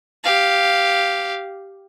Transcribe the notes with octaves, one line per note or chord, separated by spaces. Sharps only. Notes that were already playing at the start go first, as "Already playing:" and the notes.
G4 F5